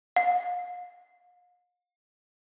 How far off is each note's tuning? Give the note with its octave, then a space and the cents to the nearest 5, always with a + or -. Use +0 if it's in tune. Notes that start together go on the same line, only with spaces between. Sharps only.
F5 +40